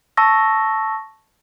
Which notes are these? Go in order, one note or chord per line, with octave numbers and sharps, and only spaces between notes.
A5 C#6 E6 A#6